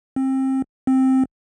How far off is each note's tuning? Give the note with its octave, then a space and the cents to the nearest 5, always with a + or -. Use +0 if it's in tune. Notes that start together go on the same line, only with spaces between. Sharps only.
C4 +25
C4 +5